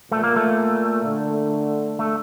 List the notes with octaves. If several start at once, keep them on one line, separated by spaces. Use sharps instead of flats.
A#2 A3
A#3
A3
D3
A3